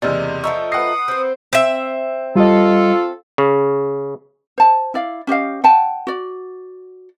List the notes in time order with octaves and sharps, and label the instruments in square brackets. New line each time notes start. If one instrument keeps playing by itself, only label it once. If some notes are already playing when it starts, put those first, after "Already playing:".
[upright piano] F#1 E2 C3 [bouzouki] G#3 [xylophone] D5 E6 F6
[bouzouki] F3 A3 D#4 [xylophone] C#6 [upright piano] E6
[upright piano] B4 F#5 C7 [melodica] D#6 [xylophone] A#6
[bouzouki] C4 C5
C4 E5
[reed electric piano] G3 D#5 [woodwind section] F4 A4
[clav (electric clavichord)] C#3
[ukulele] C5 A5
E4 D5 F5
C#4 G4 D#5 F5
F#5 G5 A5
F#4 D5